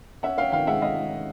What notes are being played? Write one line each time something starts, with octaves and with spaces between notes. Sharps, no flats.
C#4 E5 F#5
C#4 F5 G5
D#3 F5 G5
G#3 E5 F#5
G#3 D#5 F5
G#3